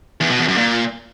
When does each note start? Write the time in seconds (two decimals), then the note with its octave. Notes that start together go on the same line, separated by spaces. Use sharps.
0.21 E2
0.30 B2
0.39 E2
0.48 F#2
0.57 A#2